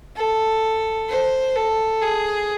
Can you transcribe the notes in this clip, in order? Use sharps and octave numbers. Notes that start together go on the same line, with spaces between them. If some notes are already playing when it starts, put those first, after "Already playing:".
A4
C5
A4
G#4